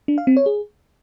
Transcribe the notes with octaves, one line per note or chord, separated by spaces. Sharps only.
D4
F5
C4
C#5
G#4